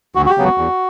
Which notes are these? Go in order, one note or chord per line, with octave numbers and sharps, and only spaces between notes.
D2 F#4
F#4
G4
C#3 F#3 B3
F#4
E2